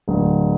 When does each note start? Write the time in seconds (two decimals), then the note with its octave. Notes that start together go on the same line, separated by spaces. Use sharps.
0.08 D1